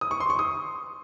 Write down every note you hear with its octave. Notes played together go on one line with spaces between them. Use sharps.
D#6
C#6
C6
C#6
D#6